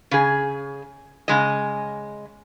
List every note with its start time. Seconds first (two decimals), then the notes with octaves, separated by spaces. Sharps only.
0.11 C#3 G#4
1.28 C#3 G#3 D#5